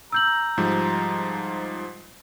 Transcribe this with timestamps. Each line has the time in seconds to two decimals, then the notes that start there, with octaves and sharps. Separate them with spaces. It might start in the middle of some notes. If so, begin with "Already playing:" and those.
0.12 A#5 E6 G6 F#7
0.58 G#2 F3 G3